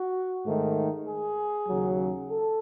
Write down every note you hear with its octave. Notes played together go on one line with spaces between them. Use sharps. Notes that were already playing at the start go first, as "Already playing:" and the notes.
Already playing: F#4
G#2 D#3 A3
G#4
D#2 C#3 F#3
A4